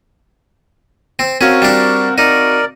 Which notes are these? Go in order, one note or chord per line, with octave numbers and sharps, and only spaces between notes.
C4
C4 C#4 F#4 A#4 F5
G3 D4
D#4 A#4 D5